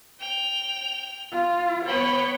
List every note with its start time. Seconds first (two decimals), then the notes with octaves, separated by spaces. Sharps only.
0.20 G5 F7
1.32 F4
1.86 B3 C#5 G5 B5